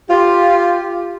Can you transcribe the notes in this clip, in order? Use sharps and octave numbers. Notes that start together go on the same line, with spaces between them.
F4 G4